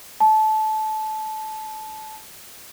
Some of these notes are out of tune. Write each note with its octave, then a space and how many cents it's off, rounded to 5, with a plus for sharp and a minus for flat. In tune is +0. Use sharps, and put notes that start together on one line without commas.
A5 -20